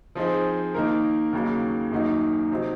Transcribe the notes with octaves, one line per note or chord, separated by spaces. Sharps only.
F3 C4 D#4 G#4 C5
D#3 A#3 D#4 A#4
D#2 C#3 F#3 A#3
F#2 D#3 A#3 D#4 F#4
C3 F#3 C4 D#4